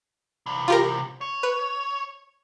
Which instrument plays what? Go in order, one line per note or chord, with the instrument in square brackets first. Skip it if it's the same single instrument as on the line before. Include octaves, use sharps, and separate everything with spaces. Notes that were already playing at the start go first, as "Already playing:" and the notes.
[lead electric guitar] C3 E3
[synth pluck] F4 G4 A#4
[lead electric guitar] C#5
[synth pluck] B4